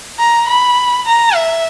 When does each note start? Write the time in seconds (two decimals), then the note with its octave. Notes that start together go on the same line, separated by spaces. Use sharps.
0.18 A#5
0.48 B5
1.06 A#5
1.34 E5